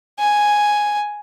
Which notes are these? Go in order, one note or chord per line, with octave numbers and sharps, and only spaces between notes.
G#5